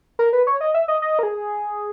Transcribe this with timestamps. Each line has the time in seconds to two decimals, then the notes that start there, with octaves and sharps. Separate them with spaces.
0.19 A#4
0.33 B4
0.47 C#5
0.61 D#5
0.74 E5
0.88 D#5
1.02 D#5
1.19 A#4
1.23 G#4